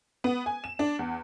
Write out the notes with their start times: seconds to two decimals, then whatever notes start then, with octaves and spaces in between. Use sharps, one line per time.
0.24 B3
0.46 G#5
0.64 E7
0.79 D4
0.99 E2